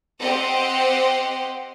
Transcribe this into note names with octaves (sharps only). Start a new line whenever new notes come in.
C4 G4 C5 D#5 F#5